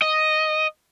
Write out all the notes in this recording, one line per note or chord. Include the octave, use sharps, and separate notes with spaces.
D#5